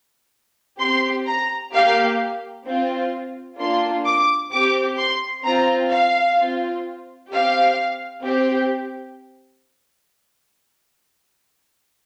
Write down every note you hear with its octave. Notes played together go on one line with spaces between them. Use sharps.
C4 G4 C6
A#5
A#3 G4 F5
C4 F4
A#3 D4 F4 C6
D6
C4 G4 D6
C6
C4 F4 A#5
F5
C4 F4
C4 G4 F5
C4 G4